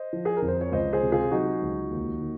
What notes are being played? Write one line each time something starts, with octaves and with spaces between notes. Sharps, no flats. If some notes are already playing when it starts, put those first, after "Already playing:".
Already playing: C5 D#5
F3
G#4
A#4
F2
C5
C#5
C#2 C5 D#5
G#4 C5
C3
F4 G#4
F#3 D#4 F#4
C#2
D#2
D#3